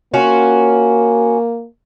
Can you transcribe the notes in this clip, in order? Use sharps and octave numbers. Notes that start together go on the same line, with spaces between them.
A#3 C#4 F4 F#4